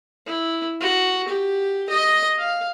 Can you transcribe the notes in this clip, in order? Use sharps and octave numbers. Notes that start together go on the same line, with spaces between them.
E4
F#4
G4
D#5
F5